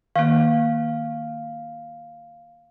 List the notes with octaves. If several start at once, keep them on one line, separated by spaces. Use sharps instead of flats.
D#3 A#3 F5